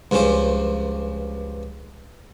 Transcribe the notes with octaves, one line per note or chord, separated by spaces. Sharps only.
C#2 G2 F3 C#4 C5